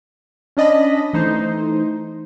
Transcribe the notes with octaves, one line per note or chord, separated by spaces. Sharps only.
C#4 D4 D#5 A5 B5
E3 A3 D#4 C5